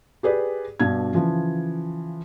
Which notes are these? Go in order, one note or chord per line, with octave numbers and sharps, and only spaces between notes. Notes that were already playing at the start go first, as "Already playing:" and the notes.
G4 G#4 B4 D5
G2 B2 D4 G#6
C#3 E3 F3